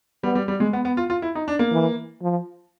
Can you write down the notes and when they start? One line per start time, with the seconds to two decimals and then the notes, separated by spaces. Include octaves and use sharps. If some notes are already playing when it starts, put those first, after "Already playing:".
0.23 G3 B3
0.35 G3
0.48 G3
0.60 G#3
0.73 B3
0.85 B3
0.97 F4
1.10 F4
1.22 E4
1.35 D#4
1.48 D4
1.59 A#3
1.72 E3
2.22 F3